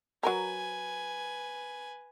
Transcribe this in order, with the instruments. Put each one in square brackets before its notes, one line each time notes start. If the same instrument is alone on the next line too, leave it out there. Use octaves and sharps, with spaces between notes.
[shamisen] F#3 A#4 A#5 [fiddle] B4 G#5